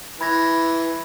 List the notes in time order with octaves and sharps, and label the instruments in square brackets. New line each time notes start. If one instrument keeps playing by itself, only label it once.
[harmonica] E3 [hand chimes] B5 G#6 A#6